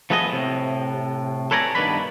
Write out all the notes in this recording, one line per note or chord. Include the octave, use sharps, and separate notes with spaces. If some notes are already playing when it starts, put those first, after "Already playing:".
F3 A3 B3 G#4 D#5
A2 C3
A4 B4 C#5 D5 G#5 A#5
G2 B2 D#3 D4 B4 B5